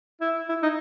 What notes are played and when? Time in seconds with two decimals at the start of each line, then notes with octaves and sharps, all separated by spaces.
0.21 E4
0.49 E4
0.63 D#4